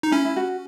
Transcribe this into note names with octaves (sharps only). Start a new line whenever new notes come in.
D#4
C#4 E4
E4
F#4